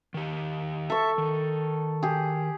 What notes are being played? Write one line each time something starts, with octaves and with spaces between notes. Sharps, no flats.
D#3 G4
A4 E5 C#6
D#3
G4 G#4